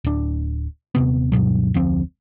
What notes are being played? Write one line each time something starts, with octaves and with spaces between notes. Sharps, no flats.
D1 D4
D#1 C3 B3
D2 G2 B2 F#3
F1 D2 F3 C4